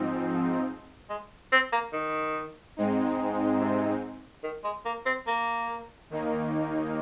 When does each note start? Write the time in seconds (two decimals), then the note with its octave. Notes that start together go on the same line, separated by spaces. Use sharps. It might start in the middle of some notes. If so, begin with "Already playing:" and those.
Already playing: G#2 F3 C4 D#4
1.10 G#3
1.52 C4
1.72 A#3
1.93 D#3
2.77 G#2 G#3 C4 D#4
3.60 C3
4.44 D#3
4.64 G#3
4.85 A#3
5.06 C4
5.27 A#3
6.10 D#2 D#3 A#3 D#4